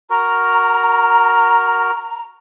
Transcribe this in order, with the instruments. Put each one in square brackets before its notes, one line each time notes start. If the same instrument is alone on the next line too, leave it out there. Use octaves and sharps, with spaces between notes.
[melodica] F#4 A#4 [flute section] A#5